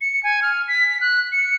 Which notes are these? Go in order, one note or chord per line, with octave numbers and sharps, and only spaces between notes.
C#7
G#5
F6
B6
F#6
C#7